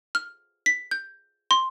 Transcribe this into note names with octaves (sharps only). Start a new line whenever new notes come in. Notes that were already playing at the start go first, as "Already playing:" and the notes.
F6
B6
G6
C6